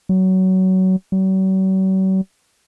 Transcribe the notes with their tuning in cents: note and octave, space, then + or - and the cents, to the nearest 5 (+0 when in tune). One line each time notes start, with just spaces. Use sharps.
F#3 +20
F#3 +45